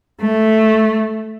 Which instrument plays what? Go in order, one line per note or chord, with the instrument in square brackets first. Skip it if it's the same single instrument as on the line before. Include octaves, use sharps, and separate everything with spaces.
[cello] A3